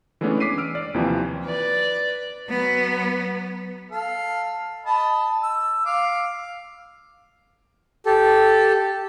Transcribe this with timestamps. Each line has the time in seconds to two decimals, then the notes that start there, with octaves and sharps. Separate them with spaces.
0.21 E3 G#3 A3 B3 C#4 D4
0.40 D6 B6 C7 D#7
0.58 E6 F6 D7
0.75 D5
0.94 D#2 C3 E3 F3
1.45 B4 D5
2.49 F#3 B3
3.91 A4 F5
4.86 D#5 A5 B5
5.43 E6
5.85 F5 D6
8.06 G4 A4